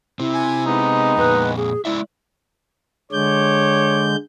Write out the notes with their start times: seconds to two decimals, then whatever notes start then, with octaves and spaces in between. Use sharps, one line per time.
0.20 C3 C4 E4
0.34 G#5
0.66 G#3 B3 D#4
1.17 F2 A#2 B4
1.57 G#4
1.85 G#3 E4 D5 E5
3.12 D3 G#3 C#5 D6 G6